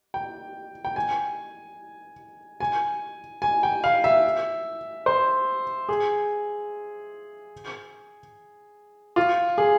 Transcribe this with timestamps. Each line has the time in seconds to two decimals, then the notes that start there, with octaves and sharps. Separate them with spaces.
0.14 G5
0.85 G5
0.96 G#5
2.60 G#5
3.42 G#5
3.63 G5
3.84 F5
4.04 E5
5.06 C5
5.89 G#4
9.16 F4
9.58 G#4